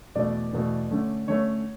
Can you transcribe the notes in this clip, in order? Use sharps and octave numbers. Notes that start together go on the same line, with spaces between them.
E2 B2 A3 D5
E2 B2 A3
D3 A3 C#4
D3 A3 C#4 C#5